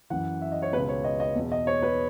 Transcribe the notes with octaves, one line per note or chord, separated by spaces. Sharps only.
F#2 E3 F#5
E5
D#5
C#5
C#2 B2 B4
C#5
D#5
D#5
E2 B2
D#5
C#5
B4